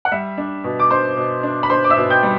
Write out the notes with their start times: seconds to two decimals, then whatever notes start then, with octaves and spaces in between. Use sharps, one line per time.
0.05 F#5
0.12 G3 E5
0.38 D4
0.64 B2
0.79 D6
0.90 D4 C5 C6
1.17 B2
1.43 D4
1.63 B5
1.70 D4 C5 C6
1.84 D6
1.90 E5 E6
1.97 B2
2.10 G5 G6
2.23 G3